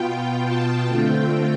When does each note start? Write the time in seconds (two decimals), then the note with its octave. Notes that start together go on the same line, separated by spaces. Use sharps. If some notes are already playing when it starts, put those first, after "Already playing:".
Already playing: B2 B3 F4 G5
0.45 A5
0.86 D3 A3 C4 F4 G5